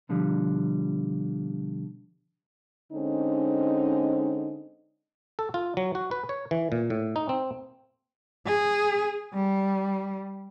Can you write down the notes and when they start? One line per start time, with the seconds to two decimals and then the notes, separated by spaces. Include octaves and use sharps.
0.09 B2 D3 F3 G3
2.92 D3 G#3 C4 C#4 D#4
5.39 A4
5.54 F4
5.77 F#3
5.95 F#4
6.11 B4
6.29 C#5
6.51 E3
6.72 A#2
6.90 A2
7.16 D#4
7.29 C4
8.46 G#4
9.34 G3